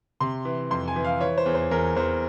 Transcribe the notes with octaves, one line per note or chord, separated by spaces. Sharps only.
C3 C6
E3
F2 C6
G#5
E3
F5
E3 C#5
C5
E2
C5
E2 A#4
E2 C5